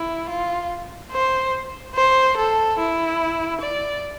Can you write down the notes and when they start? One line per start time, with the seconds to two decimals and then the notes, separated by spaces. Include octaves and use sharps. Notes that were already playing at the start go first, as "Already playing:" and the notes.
Already playing: E4
0.29 F4
1.12 C5
1.95 C5
2.37 A4
2.79 E4
3.61 D5